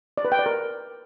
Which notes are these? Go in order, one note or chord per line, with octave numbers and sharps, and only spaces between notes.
D5
B4
G5
D5
A#4